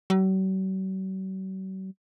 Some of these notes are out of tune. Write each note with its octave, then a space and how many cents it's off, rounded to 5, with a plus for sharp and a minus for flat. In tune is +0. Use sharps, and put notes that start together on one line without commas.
F#3 +45